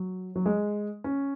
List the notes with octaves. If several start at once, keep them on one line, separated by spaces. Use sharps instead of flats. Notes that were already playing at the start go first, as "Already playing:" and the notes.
Already playing: F#3
F#3
G#3
C#4